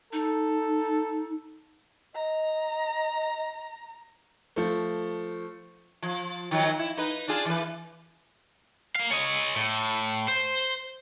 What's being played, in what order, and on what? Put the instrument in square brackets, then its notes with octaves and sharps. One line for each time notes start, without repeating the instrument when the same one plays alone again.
[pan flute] D#4 [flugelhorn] A4
[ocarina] D#5 [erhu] A#5
[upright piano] F3 A3
[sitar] F3
D#3 F3 F#3
E4
D#4 B4
D4 F4 G#4
E3 B4
[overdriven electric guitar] A#3 F5
C#5 D#5
A2
C5